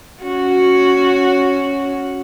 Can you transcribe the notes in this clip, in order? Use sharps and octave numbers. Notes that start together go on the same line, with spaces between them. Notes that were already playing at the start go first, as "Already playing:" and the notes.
C#4 F#4